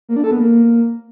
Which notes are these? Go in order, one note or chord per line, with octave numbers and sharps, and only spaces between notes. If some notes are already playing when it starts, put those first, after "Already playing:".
A#3
D4
A4
B3
A#3